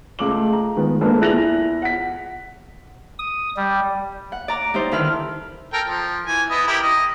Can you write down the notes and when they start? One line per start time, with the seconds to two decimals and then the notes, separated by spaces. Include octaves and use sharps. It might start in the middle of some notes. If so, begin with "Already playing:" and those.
0.19 C#2 A3 D6 F#7
0.53 A#5
0.77 D#3 G#3 B3
1.01 G#3 A#3 D4 A4 B4
1.20 E2 E4 F#6 A#6 F7 F#7
1.82 F#5 B6
3.19 D#6
3.57 G3
4.32 F#5
4.48 D5 A#5 D6
4.74 G3 D#4 E4 C5
4.92 D3 D#3 E4 B4 F6
5.73 A4 A#4 G5
5.87 F3
6.26 E3 G#5
6.50 B3 E4 D#5
6.67 E4 G4 A#4
6.83 D#5